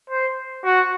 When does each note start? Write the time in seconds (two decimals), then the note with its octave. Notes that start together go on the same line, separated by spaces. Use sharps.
0.10 C5
0.64 F#4